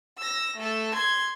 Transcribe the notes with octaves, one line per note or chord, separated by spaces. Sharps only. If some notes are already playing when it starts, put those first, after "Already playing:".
E6 A#6
A3 A4
C6 G#6